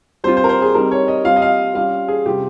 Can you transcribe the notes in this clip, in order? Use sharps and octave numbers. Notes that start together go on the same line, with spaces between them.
G3 C4 F4 C5
C5
A#4
C5
G#4
G3 C4 D#4 A#4
C#5
D#5
G3 C4 F4 F5
D#5
F5
G3 C#4 F4 F5
G#4
C3 G3 C4 F4 G4